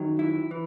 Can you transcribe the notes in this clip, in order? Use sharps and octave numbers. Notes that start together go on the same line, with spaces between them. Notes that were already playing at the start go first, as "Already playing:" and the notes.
Already playing: F#2 D#3 F#3
E4
E3